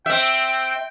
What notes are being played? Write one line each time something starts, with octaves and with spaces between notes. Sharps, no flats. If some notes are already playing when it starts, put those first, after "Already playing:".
C4 E5 G5